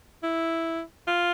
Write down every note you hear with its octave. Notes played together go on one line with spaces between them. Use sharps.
E4
F4